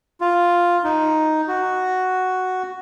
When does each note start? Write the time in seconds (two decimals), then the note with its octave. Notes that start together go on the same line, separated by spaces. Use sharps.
0.21 F4
0.84 D#4
1.48 F#4